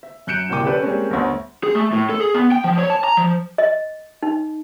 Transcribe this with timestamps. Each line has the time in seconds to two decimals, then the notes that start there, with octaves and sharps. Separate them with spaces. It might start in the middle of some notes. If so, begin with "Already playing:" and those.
0.03 E5
0.27 F#2 F#6 G6 C#7 D7 E7
0.49 D1 C2 A#3 G5 D6 D#7
0.65 C#4 G4 A4 B4 D5
0.82 G3 G#3 A#3 C4 C#4
1.10 G1 D2
1.64 G#4
1.75 A3
1.93 A2
2.10 A4
2.21 G#4
2.34 B3
2.52 G5
2.64 F3
2.78 C#5
2.90 A5
3.04 A#5
3.17 F3
3.58 D#5
4.23 D#4